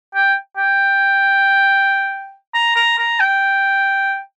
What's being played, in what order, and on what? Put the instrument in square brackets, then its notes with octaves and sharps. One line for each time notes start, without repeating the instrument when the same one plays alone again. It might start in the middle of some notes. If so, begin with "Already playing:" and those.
[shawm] G5
G5
A#5
A#5
A#5
G5